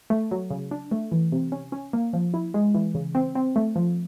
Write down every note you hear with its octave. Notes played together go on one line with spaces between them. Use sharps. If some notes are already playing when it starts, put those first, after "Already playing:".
A3
F#3
C#3
D4
A3
E3
C3
C#4
C#4
A#3
F3
E4
G#3
E3
C#3
C4
C4
A3
F3